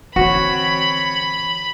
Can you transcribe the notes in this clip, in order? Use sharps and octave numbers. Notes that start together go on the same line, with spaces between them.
D3 E3 C4 F#4 C#5 B5